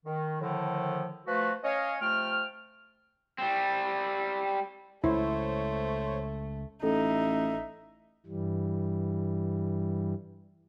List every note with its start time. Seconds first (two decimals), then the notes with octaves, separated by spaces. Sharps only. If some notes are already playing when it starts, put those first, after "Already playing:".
0.05 D#3
0.41 A2 D3 D#3 F3
1.27 F3 A3 F#4 B4
1.64 C#4 C#5 D#5 F5
2.01 C3 F3 A3 G5 F6
3.38 G3 C4
5.04 C#2 A3 E4 C5 C#5
6.83 A1 D#4 A4 E5
8.26 G2 E3 G3